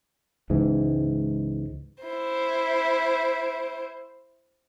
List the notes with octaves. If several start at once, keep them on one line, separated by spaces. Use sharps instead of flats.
C#2 G#2 E3
E4 C5